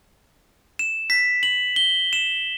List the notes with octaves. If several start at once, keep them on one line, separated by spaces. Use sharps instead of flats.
E7
B6
F#7
G7
E7